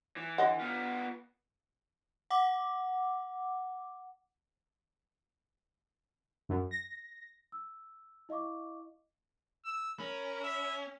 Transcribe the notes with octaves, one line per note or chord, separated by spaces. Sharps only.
E3
D3 D#5 F#5
B3 F4
F#5 D6
F#2
A#6
E6
E4 D#5 F5 C#6 D6
E6
C#4 A#4 B5
E5